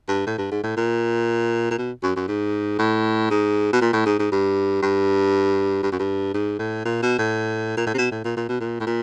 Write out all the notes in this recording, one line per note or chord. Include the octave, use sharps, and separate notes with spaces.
G2
A2
G2
G#2
A2
A#2
A#2
B2
F#2
F#2
G#2
A2
G#2
B2
A#2
A2
G#2
G#2
G2
G2
G2
F#2
G2
G#2
A2
A#2
B2
A2
A#2
A2
C3
B2
A2
A#2
A#2
B2
A#2
A2
A#2